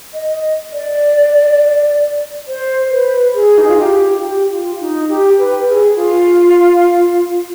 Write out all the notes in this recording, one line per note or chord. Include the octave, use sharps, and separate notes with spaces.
D#5
D5
C5
B4
G#4
D#4
F4
G4
G4
F4
D#4
G4
B4
G#4
F4